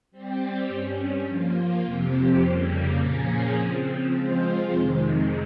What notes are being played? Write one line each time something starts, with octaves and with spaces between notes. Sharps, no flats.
G3 C4 G4
G2 G3 C#4
F3 A#3 F4
F2 C3 F3 C4 G4
F2 C#3 G3 A#3
A#2 F3 A#3 C#4 G#4
C#3 F3 C4
F3 G#3 C4 F4 C5
F2 C3 D#3 G#3